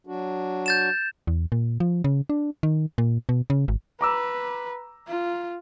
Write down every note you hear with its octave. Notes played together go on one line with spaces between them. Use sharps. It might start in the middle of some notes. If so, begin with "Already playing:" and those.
F#3 D4 F#4
G6 A6 E7
E2
A#2
F3
C#3
D4
D#3
A#2
B2
C#3
G#1
B4 A#5 D6 E6
F4